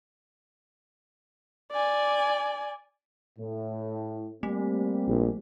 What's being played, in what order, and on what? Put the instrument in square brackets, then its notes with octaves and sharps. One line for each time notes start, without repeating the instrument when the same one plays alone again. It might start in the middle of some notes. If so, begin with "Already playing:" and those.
[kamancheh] D5 G#5
[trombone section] A2
[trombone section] G3 A#3 C4 [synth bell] A3
[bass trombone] A#1